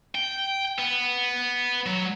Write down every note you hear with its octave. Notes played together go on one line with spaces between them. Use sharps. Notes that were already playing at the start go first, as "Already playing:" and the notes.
G5
B3
F#3